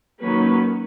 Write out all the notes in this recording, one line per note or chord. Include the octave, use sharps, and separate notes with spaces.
D#3 F#3 A#3 C#4 B4